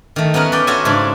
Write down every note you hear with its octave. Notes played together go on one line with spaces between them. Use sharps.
D#3 A3
B3 C#4 A#4 F#5
B4 D5 G5
C#4 F#4 A4 C5 E5 G#5
G#2 C#3 D4 C6